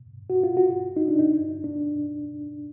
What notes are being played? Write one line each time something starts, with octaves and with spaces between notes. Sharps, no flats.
F#4
F4
F#4
D#4
D4
D#4
D4